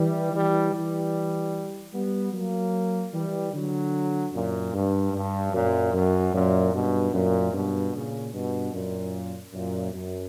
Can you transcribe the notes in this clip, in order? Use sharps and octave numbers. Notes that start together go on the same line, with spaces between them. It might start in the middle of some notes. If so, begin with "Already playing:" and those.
Already playing: E3 G3
E3 G3
E3 G3
G3 B3
F#3 A#3
E3 G3
D3 F#3
F#2 A#2
G2
G2
F#2 A#2
F#2
F#2 A#2
G2 B2
F#2 A#2
G2 B2
A#2 C#3
G2 B2
F#2 A#2
F#2 A#2
F#2